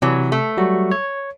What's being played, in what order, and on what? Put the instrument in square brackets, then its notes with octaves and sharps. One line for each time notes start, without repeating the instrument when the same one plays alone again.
[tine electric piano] C3 [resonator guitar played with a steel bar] E3 F#3
[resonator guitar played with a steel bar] A3
[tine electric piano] F#3 G3 F#4
C#5